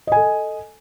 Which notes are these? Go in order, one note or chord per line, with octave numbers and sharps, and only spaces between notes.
A4 D#5 G#5